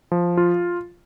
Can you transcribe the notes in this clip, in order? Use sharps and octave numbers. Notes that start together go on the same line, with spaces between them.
F3
F4